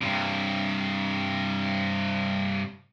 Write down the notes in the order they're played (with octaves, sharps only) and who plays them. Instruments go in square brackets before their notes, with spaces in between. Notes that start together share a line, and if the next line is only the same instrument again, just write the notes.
[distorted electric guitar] G2 C3